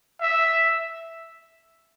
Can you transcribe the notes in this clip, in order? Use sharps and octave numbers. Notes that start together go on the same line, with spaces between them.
E5